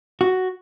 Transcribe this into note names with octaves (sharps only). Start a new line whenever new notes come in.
F#4